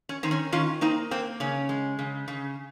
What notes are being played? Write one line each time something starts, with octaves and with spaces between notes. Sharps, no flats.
C#4
D#3 C4
C#4
D#3 C#4 F4
A#3 C4 D#4
A#3 C4
C#3 C#4
G#3
C#3
C#3